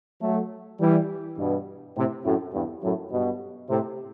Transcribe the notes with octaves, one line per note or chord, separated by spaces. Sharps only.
F#3 A3
E3 G3
G2 B2
A2 C3
F#2 A2
E2 G2
F#2 A2
G2 B2
A2 C3